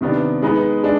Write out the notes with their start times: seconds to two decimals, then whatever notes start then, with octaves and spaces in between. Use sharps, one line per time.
0.01 C3 D#3 B3 D4
0.42 G#3 B3 D#4 B4
0.83 G#3 D4